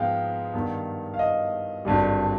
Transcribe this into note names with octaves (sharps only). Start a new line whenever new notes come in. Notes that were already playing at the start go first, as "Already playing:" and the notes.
Already playing: G#2 F3 G#3 B3 F5 G5
G2 D#3 B3
F5
D#5
G#1 G2 D3 G3